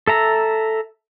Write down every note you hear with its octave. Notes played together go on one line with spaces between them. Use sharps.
A4 E5 A#5